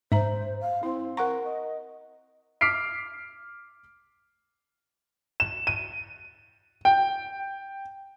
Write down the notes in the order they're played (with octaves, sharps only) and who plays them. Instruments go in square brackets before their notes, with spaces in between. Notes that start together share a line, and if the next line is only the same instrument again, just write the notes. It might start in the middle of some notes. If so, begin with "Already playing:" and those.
[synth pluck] G#2 [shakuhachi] C5 [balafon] E5 A#5
[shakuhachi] F5
[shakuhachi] C4 [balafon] E4
[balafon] A#4 F#5 C#6 [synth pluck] A#5
[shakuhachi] D#5
[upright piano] D6 F6 B6 C7 D7
[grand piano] E7
D#7
G5